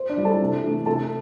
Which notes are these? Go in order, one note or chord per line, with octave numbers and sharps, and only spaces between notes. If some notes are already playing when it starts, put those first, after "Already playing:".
Already playing: C5
D4 D5
G3 E4
A4 A5
C3
E3 A3 D4
C3 A4 A5